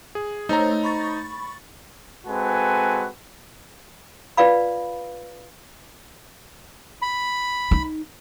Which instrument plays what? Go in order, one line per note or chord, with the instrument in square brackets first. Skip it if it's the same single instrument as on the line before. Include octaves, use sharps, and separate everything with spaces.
[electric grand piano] G#4
[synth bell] A3 C5 C#5 [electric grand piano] D#4 A#5
[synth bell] B5 C#6 A6
[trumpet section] G#3 C4 F#4 A4 B4 G#5
[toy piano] F4 B4 D5 F5 B5
[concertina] B5
[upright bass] D#4